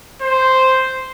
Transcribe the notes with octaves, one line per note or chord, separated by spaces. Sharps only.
C5